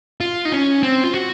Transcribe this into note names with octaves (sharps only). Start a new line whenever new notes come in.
F4
D#4
C#4
C4
F4
F#4